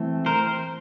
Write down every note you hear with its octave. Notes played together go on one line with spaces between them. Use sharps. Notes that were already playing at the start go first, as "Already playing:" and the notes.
Already playing: E3 A3 C4
A#4 C5